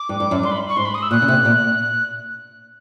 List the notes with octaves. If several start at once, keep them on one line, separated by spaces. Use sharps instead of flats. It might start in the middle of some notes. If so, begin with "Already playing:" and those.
Already playing: D6
G2
G2
F#2
G2 C6
B5
C#6
G#2 C6
B5
D#6
E6
A#2 F#6
C#3
C3
A#2